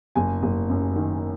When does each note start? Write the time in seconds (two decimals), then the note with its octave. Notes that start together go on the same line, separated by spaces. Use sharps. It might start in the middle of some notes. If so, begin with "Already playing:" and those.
0.15 F#1 G#5
0.42 F#1
0.69 F#2
0.95 D#3